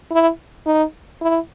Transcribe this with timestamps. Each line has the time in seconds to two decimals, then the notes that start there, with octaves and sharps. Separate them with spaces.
0.12 E4
0.66 D#4
1.22 E4